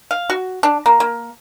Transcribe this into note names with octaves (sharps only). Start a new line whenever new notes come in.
F5
F#4
D4
A#3
A#3